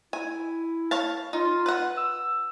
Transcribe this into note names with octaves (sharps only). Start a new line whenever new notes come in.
E4 G#5
C#5 F5 A5
D#4 F4
B4 F#5
E6